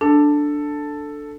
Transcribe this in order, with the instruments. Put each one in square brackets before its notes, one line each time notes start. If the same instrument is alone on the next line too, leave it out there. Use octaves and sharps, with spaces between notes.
[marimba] D4 [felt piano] A4